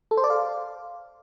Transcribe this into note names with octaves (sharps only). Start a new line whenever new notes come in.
A4
C5
D5
F5